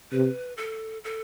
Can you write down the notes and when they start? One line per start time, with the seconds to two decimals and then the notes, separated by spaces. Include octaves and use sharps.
0.12 C3 B4
0.57 A4
1.04 A4